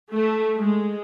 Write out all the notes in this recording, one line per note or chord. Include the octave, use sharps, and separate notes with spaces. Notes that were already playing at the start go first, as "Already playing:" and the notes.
A3
G#3